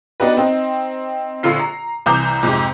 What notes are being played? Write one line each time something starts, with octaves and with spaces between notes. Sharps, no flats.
B3 D4 D#4 F#4 G4 B4
C4 D#4
A#1 D3 F4 C7
A#5
C2 E3 A#5 D6 G6
F2 G#2 C3